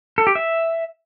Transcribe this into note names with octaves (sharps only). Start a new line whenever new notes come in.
A4
G4
E5